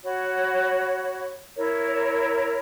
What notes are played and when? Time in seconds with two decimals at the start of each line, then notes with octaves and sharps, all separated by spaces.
0.03 F#4 C#5 F#5 B5
1.55 E4 A#4 C#5